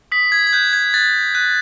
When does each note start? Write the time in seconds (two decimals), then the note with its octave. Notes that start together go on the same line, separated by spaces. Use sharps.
0.12 D#6 B6
0.32 G#6
0.47 G#6
0.53 F#6 G6
0.73 G#6
0.94 F#6 A6
1.35 F#6